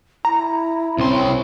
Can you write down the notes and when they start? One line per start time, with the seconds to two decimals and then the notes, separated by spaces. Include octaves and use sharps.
0.25 E4 A#5
0.98 C2 C4 C#4 C6